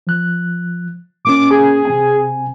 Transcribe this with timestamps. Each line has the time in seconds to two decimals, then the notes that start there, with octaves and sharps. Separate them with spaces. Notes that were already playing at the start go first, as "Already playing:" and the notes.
0.07 F3 F#6
1.25 A#2 A#3 C#4 D6
1.51 G#4
1.85 C3 C4 G#5